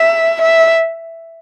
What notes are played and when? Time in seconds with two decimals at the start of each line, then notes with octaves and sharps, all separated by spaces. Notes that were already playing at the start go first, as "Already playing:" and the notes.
Already playing: E5
0.41 E5